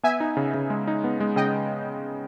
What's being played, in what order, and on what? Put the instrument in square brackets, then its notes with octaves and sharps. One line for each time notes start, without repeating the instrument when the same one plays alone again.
[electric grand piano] B3 [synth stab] E5 G#5
[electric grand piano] D#4
C#3
C#3
G#3
D#4
B3
G#3
[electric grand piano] C#3 [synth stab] D#5 G5